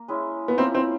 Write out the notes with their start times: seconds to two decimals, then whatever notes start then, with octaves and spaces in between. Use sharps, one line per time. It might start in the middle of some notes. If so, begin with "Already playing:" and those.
Already playing: A#3
0.08 G#3 C#4 E4
0.48 B3
0.57 F3 A#3 C4 C#4 E4
0.75 C4